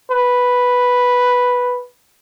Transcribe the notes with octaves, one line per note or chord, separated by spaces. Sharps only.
B4